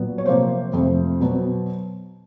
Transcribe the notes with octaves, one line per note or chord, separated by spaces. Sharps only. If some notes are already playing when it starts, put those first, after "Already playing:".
Already playing: A#2 F#3 B3
C#5
C3 F3 A#3 C5
F2 C3 F3 A3
B2 F#3 B3